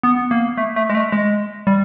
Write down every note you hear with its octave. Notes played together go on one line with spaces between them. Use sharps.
B3
A#3
A3
A3
G#3
A3
G#3
G3